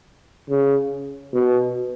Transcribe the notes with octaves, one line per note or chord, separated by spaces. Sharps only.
C#3
B2